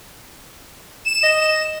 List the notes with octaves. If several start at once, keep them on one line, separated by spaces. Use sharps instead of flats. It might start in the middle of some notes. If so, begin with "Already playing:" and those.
E7
D#5